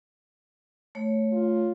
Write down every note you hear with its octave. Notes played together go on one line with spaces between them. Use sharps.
A3 C#5
F4